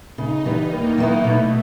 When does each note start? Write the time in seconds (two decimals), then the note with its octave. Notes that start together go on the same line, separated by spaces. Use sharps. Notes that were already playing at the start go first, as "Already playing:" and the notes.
0.18 C#3 D#4
0.45 E3 G3 B3
0.71 D#2 A#3
0.97 D#3 F#3 B3 E4
1.24 B2 A3